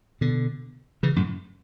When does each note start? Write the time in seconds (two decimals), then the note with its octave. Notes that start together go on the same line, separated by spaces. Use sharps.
0.21 B2 D3
1.03 C#3 E3
1.16 F#2 A2